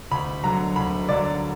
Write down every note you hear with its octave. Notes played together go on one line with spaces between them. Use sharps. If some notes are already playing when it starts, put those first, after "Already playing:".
D2 B5
D3 F#3 A#5
D2 B5
D3 F#3 D5